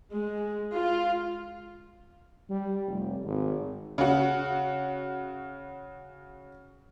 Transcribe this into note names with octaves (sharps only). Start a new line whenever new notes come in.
G#3
F4
G3
F1
G#1
C#3 F#4